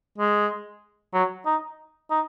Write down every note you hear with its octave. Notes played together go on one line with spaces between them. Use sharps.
G#3
F#3
D#4
D#4